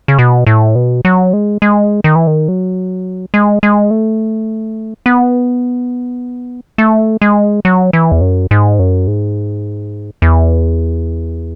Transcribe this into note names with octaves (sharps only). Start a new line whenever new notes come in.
C#3
B2
A2
B2
F#3
G#3
G#3
D#3
E3
D#3
F#3
G#3
G#3
A3
B3
A3
G#3
F#3
E3
E2
F#2
G#2
F#2
G#2
E2